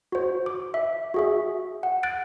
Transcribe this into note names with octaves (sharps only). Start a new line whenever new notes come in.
F#4 C5
D6
E5
F#4 G#4 E5
F#5
F#6 A6 D7